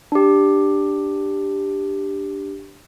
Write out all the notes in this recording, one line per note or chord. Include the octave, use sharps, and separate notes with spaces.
D4 G4